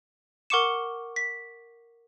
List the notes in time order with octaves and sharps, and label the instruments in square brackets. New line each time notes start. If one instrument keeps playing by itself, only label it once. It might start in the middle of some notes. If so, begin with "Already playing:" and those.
[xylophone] A#4 F#5 C#6 D6 C#7 E7
B6